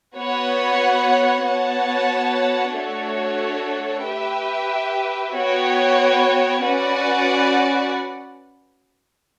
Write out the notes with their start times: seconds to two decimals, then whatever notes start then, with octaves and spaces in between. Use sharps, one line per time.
0.16 B3 F#4 C#5 F#5
1.45 B3 F#4 C#5 F#5 A5
2.75 A3 D4 F#4 A4 C#5
4.05 G4 B4 E5 G5
5.34 B3 F#4 C#5 G5
6.64 C#4 F#4 B4 D5 F#5